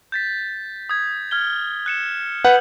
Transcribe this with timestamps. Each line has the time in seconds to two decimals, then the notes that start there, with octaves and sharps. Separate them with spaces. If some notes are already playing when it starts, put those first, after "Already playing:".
0.12 G6 A6 B6
0.89 D#6 G#6
1.31 F6 G#6 G7
1.86 F#6 C#7 E7
2.45 B4 F#5 G6 F#7